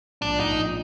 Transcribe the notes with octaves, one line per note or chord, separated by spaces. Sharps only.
A#1 D4
A#1 D#4
A#1